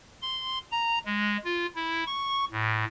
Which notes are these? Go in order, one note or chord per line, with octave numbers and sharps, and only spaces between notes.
C6
A#5
G#3
F4
E4
C#6
A2